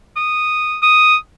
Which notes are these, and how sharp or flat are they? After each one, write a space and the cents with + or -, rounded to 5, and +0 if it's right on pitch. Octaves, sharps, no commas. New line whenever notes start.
D#6 -5
D#6 +0